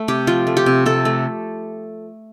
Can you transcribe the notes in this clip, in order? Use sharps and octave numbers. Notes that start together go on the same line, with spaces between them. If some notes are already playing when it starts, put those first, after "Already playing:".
Already playing: A3
C3 G4
F3 F4
A3
G4
C3
C3 A4
A3